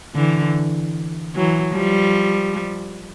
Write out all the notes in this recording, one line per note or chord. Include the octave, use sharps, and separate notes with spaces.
D3 E3
E3 F#3
F3 G3